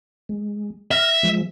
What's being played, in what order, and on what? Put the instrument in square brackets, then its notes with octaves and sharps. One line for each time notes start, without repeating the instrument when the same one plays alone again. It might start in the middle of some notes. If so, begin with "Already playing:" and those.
[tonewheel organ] G#3
[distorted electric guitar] E5 [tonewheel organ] F6 A#6
[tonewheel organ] F3 G#3